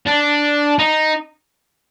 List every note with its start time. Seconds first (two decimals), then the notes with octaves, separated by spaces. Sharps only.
0.06 D4
0.79 D#4